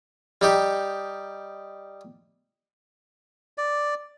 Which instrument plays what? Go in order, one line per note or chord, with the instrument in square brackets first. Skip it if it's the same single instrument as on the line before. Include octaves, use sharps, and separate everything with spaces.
[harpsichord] G3 D#4 G4
[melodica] D5